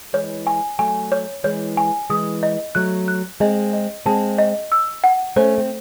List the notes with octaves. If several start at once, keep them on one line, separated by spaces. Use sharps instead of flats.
E3 G#3 C#5
G#5
F#3 A3 G#5
C#5
E3 G#3 C#5
G#5
E3 G#3 D#6
D#5
F#3 A3 F#6
F#6
G#3 C4 D#5
D#5
G#3 C4 A5
D#5
E6
F#5
A3 C#4 C5
C4